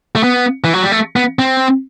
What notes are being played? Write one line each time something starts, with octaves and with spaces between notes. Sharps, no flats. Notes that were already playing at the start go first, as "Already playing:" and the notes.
A3
B3
E3
F#3
G3
A3
B3
C4